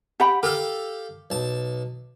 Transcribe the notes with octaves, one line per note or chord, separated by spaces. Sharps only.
G4 F#5 B5
G4 A4 A#4 F5
B1 A5